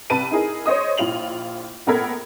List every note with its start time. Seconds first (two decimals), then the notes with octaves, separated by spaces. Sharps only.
0.10 C2 B4 A5 D#7
0.31 D#4 E4 G#4 A#4
0.66 C5 C#5 D#5 D#6
0.98 A#1 E4 F4 F7 F#7
1.87 A#1 B3 A4 A#4 B5 G#6